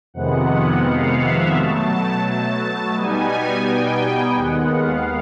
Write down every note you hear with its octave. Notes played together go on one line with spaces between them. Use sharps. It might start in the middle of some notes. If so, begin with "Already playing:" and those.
F2 C3 D#3 G#3 B3 F#5
F5
E5
B2 F#3 A3 A5
A5
B2 G3 B3 D#4 G#5
G5
D#2 D#3 G#3 B3 F#5
F5